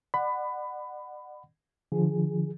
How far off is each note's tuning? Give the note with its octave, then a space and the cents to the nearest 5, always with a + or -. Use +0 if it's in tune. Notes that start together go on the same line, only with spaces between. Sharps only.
D5 +40 F#5 +0 B5 +20
D3 +20 F3 -10 G#4 -5